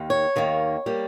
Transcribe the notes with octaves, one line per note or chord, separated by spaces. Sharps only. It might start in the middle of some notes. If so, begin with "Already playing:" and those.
Already playing: D#2 D#3
C#5
D#2 D#3 A#3
G3 A#3